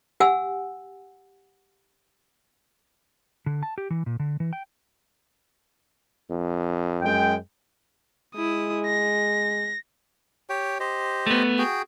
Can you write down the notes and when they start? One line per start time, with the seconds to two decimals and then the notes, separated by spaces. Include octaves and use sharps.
0.20 G4 F#5 G#5 E6
3.46 D3
3.63 A5
3.78 G4
3.90 E3
4.06 A#2
4.20 D3
4.40 E3
4.53 G5
6.30 F2
7.02 F#2 G#3 G5
8.35 G#3 E4 D#6
8.86 A#6
10.49 G4 C#5 G5
10.80 G4 C5 D#5
11.27 A3 B3
11.58 F#4 G#4 G5